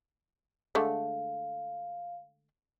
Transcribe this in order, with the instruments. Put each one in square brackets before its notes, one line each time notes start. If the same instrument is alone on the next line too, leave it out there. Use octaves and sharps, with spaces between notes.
[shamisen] D3 G#3 A3 [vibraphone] F5